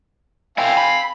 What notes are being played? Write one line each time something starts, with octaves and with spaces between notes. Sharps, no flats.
C4 E4 F5 G5 G#5
B5